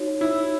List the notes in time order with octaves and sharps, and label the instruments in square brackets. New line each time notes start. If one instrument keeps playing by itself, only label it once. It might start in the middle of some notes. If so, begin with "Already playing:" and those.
Already playing: [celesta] D#4 F#4 C#5
[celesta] D#4 F#4 C#5 [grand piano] E4